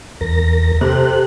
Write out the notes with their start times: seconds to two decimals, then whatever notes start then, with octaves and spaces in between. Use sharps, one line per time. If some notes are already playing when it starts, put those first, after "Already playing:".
0.21 E2 A#4 A#6
0.81 C3 A4 F#6